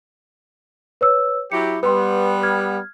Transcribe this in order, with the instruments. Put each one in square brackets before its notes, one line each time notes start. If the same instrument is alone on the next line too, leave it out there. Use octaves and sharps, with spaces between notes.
[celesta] B4 C#5 E6
[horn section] F#3 E4 G4 [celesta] C#7
[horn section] G3 B3 [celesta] B4 C6
[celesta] F6 G#6